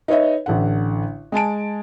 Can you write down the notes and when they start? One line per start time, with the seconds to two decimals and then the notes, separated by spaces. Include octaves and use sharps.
0.08 D#4 B4 C#5 D#5 E5
0.46 A1 D3 F#5
1.32 G#3 G#5 A5 D7